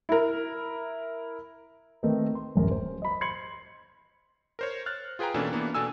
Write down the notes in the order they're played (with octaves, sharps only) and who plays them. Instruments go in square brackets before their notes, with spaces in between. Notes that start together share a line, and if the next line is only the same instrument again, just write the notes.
[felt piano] E4 A#4
[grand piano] D#3 A3 C4 D#4 A#4 B4
C6
D1 F#2 A#4
C5
D#5 B5
B5 C6 G#6 C7 C#7 F#7
[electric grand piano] A#4 C5 C#5
F6 F#6 A6
F4 G#4 B4 G5 G#5 A#5
B2 E3 A#3 C#4 D4 A4
E3 A#3 B3 D4
B2 D4 A4 G#5 E6